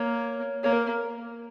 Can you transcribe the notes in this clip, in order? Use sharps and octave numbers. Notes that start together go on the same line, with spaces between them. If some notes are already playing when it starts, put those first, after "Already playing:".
Already playing: A#3 C#5
A#3 C#5
A#4